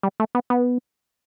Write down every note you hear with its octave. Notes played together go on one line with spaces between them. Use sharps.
G3
A3
B3
B3